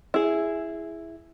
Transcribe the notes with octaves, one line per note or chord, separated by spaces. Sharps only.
E4 G#4